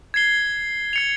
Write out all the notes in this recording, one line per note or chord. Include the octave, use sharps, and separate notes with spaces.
G#6 C7 G7
G#6 C#7 F7